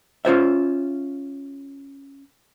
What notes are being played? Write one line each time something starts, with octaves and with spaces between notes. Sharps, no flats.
C#4 F4 C5 E5